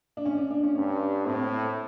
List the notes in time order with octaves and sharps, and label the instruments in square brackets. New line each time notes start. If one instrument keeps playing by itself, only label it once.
[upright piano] D4
C#4
D4
D4
C#4
[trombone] G2 [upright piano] C#4
[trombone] A2 [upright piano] C4
[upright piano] C4
C4
A3